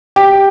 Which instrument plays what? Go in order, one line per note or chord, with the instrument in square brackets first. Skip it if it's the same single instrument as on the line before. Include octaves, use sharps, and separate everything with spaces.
[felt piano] G4